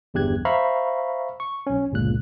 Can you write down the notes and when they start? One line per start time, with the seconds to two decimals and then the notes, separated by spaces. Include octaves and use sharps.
0.14 G1 E2 G2 G4 F#6 G#6
0.45 C5 E5 F5 A#5 B5 C#6
1.40 C#6
1.67 B1 C#4
1.92 G1 C#2 A#2 F#6